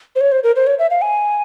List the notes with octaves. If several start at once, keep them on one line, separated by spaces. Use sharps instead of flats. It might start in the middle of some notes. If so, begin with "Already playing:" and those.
C5
C#5
C5
A#4
C5
C#5
E5
F5
G#5